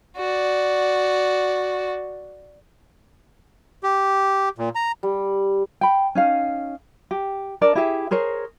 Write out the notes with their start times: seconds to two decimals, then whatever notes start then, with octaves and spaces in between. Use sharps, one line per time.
0.16 F#4 D5
3.83 G4
4.58 A#2
4.75 A#5
5.03 G3
5.81 G5 B5
6.15 C#4 D#4 F5
7.11 G4
7.61 D4 A#4 D5
7.75 E4 G4 G#4 E5
8.11 G#4 A#4 C5 C#5